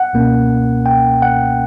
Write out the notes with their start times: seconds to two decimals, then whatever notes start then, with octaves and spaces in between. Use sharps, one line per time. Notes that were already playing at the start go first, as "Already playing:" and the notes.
Already playing: F#5
0.13 C#2 B2 A#3 C#4
0.86 G5
1.22 F#5